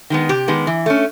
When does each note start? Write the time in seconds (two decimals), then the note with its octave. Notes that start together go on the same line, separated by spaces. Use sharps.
0.10 D#3 G#3 B3
0.29 C3 G4
0.48 D#3 G#3 B3
0.67 E3
0.86 A3 C#4